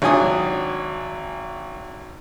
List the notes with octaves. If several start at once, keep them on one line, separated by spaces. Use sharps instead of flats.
G#1 F#3 D4 G#5 D#6